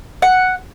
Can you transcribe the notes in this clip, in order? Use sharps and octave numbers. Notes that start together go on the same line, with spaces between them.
F#5